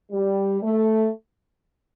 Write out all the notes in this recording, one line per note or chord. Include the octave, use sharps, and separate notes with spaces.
G3
A3